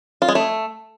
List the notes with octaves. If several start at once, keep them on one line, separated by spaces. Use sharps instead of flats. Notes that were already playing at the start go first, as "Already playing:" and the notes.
F4
G#3
A3